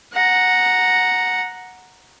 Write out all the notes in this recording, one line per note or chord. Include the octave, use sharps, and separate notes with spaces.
F#5 A#5